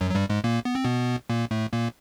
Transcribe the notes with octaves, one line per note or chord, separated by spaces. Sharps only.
F#2 F#3
F#3
G2 G3
G#2 G#3
A#2 A#3
B3
C4
B2 B3
A#2 A#3
A2 A3
A#2 A#3